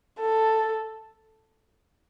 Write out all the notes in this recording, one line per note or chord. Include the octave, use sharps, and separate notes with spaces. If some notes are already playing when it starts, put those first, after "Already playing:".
A4